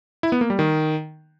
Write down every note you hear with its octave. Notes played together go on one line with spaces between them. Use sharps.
E4
B3
A#3
G3
D#3